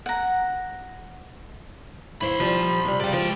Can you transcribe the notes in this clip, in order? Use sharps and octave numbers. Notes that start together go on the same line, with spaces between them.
F#5 A#5
D#2 E4 C5 B5 C6
F3 G3
C3 G3
C#3 D5 G5
F3 G#3 G5